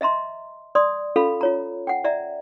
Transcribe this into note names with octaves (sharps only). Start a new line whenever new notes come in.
D#5 E5 A#5 C6
D5 C6 D#6
C#4 F4 A4 F5 B5
F4 C#5 A#5
F#5 G5
D5 E5 A#5